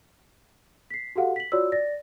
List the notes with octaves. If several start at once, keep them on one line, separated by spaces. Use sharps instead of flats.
B6 C7
F#4 G4 A4 F5 F#5
B6 F#7
F4 F#4 C#5 D5 E6
D5 A6 A#6